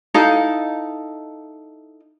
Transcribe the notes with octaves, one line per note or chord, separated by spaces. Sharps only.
D#4 E4 A4 F5